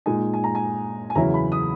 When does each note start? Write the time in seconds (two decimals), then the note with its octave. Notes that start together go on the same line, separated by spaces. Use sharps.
0.06 A#2 G#3 D#4 G#5
0.34 G#5
0.44 A#5
0.55 G#5
1.10 G#5
1.15 E2 C#3 F#3 C#4 E4 A#5
1.34 B5
1.52 D#6